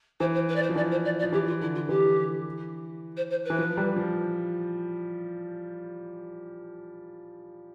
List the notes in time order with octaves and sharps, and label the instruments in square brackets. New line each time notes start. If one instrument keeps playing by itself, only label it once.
[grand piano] E3 [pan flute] C5
[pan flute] C5
B4
D5
C5
[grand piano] F3
[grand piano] E3 [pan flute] D5
[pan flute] C5
D5
D5
[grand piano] F3
[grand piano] E3 [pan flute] G4
[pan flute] F4
[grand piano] D3 [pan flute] E4
[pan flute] F4
[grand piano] E3 [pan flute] G4
[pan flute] C5
C5
B4
[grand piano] E3
F3
G3
F3